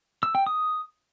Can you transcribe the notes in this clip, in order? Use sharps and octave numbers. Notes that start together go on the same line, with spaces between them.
E6
G5
D#6